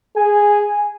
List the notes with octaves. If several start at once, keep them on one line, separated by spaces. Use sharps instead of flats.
G#4 G#5